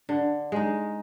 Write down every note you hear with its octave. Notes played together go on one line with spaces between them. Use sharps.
D3
G#3 D#4